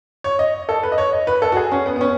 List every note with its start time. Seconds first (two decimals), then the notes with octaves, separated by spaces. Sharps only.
0.24 C#5
0.39 D#5
0.69 A4
0.83 B4
0.92 D#5
0.98 C#5
1.13 D#5
1.27 B4
1.42 A4
1.52 F#4
1.56 G#4
1.72 C#4
1.86 B3
1.96 B3
2.01 C#4